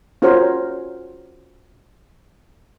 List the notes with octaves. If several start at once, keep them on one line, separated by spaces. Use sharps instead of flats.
C#4 F4 F#4 A#4 C5 C#5